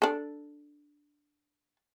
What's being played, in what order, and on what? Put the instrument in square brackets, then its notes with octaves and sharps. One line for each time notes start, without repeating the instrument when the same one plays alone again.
[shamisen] D4 A4